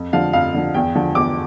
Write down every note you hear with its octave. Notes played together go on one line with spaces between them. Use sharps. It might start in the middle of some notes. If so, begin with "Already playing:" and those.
Already playing: F2
D3 F3 F5
F2 F5
D3 F3
E2 G5
D3 F3
E2 D6